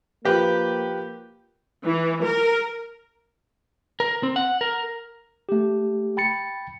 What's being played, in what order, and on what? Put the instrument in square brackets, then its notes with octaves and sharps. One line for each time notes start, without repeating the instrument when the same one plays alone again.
[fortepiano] F3 G4 B4 [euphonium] A#3
[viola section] E3
A#4
[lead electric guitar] A#4
C4
F#5
A#4
[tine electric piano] A3 G4
G5 B5 A6 C#7